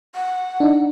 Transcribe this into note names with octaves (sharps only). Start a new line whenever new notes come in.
F#5
D4 D#4